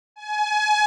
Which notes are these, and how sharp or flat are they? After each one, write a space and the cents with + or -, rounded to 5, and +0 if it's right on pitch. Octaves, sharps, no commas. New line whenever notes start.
G#5 +30